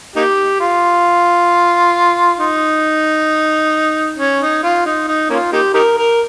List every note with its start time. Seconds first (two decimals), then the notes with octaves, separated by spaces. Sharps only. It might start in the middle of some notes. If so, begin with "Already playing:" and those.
0.16 A#3 D#4 G4
0.60 F4
2.39 D#4
4.18 C#4
4.40 D#4
4.63 F4
4.86 D#4
5.08 D#4
5.30 A#3 C#4 F4
5.53 A#3 D#4 G4
5.74 D#4 G4 A#4
5.98 A#4